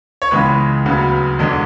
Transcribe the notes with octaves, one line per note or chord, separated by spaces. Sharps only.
C#5
C#2 C#3 E3 G#3 B3 B4
D2 C#3 F#3 B3
E1 E2 D3 G#3